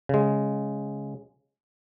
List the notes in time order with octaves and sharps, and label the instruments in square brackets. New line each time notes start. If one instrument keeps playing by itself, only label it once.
[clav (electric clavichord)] C#3 G#3